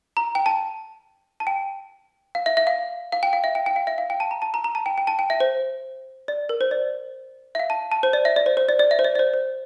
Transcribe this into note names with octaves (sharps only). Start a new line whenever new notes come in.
A#5
G5
A5
A5
G5
F5
E5
E5
F5
F5
G5
F5
E5
G5
G5
F5
E5
F5
G5
A5
A#5
A5
A#5
A#5
A5
G5
G5
A5
G5
E5
C5
D5
A#4
C5
D5
E5
F5
A5
A5
C5
D5
E5
D5
C5
C5
D5
D5
E5
C5
D5
D5
C5
C5